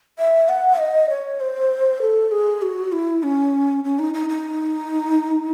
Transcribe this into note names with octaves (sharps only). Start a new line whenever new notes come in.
E5
F#5
D#5
C#5
C5
A4
G#4
F#4
E4
C#4
C#4
D#4
D#4
D#4